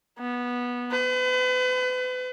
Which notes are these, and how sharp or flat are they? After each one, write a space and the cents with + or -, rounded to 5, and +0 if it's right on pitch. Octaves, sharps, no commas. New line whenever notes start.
B3 -15
B4 +40